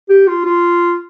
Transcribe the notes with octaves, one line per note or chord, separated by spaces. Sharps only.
G4
F4
F4